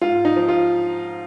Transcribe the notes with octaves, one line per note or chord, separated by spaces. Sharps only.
G#2 F4
D#4
F3
F4